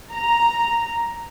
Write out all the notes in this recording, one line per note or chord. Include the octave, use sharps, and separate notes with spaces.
A#5